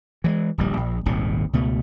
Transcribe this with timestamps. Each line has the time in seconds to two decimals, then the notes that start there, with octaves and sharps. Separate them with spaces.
0.24 E3 F#3 G#3
0.58 D1 A#1 G3
0.77 A#1
1.06 D#1 G#1 D#2 C3
1.53 C#2 B2 A3